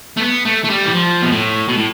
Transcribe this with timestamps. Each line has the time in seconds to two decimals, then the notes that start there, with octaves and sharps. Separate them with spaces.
0.17 A3
0.21 B3
0.45 A3
0.65 A3
0.70 G3
0.86 E3
0.94 F3
1.22 B2
1.32 A2
1.68 B2
1.77 A2